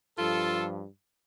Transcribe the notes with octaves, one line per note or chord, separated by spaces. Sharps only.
G2 F3 F4 A4